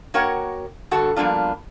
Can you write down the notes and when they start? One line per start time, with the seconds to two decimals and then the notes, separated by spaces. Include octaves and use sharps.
0.14 A#3 F#4 A#4 C#5 F#5 G5
0.91 G2 D3 F#4 A4 F#5 A5
1.16 F3 G3 A#3 B3 D4 F4